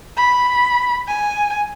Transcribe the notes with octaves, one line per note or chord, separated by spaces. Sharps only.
B5
G#5